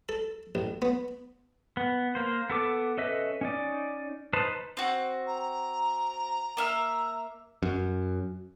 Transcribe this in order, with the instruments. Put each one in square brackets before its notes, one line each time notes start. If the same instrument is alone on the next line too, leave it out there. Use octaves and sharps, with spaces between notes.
[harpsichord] A4
A1
B3
[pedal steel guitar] B3
A#3 C5
B3 A4 D6
C#4 A4 B4 D#5 E5
C#4 D#4 D5
D#4 B4 C5 A5
[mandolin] C4 F#4
[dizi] A#5
[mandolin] A#3 E5 F6
[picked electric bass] F#2